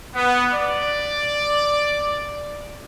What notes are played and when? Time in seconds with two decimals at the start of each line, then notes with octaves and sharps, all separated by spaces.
0.15 B3
0.52 D5